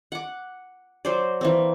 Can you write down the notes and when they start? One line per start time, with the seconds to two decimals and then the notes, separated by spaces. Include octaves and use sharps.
0.12 F#5 D6
1.05 F#3 C5 D5
1.41 E3 A#3 C4